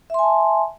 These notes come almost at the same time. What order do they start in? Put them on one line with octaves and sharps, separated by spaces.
E5 C6 G#5 A5